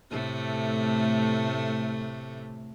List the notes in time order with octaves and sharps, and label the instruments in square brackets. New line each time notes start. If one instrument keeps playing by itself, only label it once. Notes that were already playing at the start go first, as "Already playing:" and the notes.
[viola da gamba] A2 C3 A3